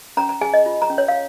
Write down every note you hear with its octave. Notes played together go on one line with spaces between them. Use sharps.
C#4 A#5
A#5
G#4 G#5
D#5
F4
A#5
C#4
C#5
F5